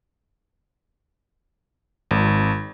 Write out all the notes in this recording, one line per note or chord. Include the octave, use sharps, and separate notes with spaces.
G#1